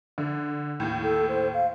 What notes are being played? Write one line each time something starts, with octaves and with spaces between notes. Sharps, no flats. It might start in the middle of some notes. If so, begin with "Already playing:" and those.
D3
D#2 A2
A4
C5
F5